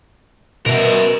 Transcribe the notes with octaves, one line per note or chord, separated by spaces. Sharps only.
B2 A#4 E5